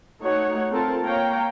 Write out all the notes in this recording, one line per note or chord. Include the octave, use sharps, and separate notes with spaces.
A3 D#4 F#4 C#5 F#5
C4 F4 A4 A#4 A5
A#3 C#5 F5 G5 A#5